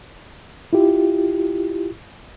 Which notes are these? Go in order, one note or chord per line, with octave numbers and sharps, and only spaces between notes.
E4 F4 G4